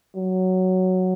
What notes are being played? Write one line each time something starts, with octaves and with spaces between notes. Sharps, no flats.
F#3